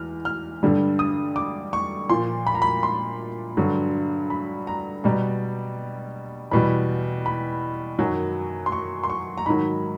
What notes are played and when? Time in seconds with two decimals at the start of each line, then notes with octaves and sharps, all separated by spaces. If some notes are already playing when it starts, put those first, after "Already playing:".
Already playing: E2 F6
0.25 F6
0.63 G2 D3 G3
0.99 D#6
1.36 D6
1.73 C#6
2.09 A#2 F3 C6
2.47 B5
2.54 A#5
2.62 B5
2.83 C6
3.57 G2 D3 F#3
4.30 B5
4.67 A#5
5.04 B2 G3 A#5
6.51 E2 B2 G3 B5
7.26 B5
7.99 F#2 D#3 F#3
8.66 C6
8.72 C#6
9.03 C6
9.10 C#6
9.37 A#5
9.46 G#2 D#3 F#3 B5